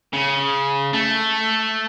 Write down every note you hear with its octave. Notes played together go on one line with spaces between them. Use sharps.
C#3
A3